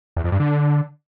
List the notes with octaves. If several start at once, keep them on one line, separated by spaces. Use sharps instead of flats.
E2
F2
G2
D3